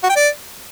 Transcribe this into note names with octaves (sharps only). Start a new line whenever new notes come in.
F#4
G5
D5